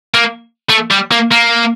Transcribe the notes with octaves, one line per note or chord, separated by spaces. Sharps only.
A#3
A3
G3
A#3
A#3